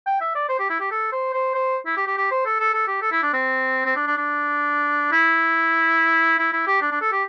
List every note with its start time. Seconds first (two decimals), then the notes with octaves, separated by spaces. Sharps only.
0.07 G5
0.21 E5
0.35 D5
0.49 C5
0.59 G4
0.70 E4
0.80 G4
0.91 A4
1.12 C5
1.33 C5
1.55 C5
1.86 E4
1.96 G4
2.07 G4
2.17 G4
2.31 C5
2.46 A4
2.59 A4
2.74 A4
2.87 G4
3.02 A4
3.12 E4
3.23 D4
3.33 C4
3.86 C4
3.96 D4
4.07 D4
4.17 D4
5.12 E4
6.38 E4
6.53 E4
6.67 G4
6.81 D4
6.91 D4
7.01 A4
7.12 G4